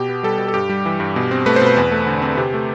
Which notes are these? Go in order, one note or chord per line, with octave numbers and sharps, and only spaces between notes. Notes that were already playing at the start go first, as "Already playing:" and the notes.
Already playing: B2 G4
B3
G3 A4
B2
A4
G2 G4
G3
E3
G2
B2
C4
A3 B4
C5
B2 B4
E2
A3
D3
C4
C3 G4
A3